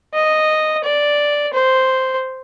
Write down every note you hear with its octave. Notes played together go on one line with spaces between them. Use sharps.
D#5
D5
C5